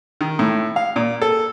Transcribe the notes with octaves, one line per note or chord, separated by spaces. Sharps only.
D#3
A2
F5
A#2
A4